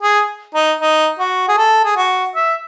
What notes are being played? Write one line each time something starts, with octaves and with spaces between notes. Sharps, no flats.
G#4
D#4
D#4
F#4
G#4
A4
G#4
F#4
E5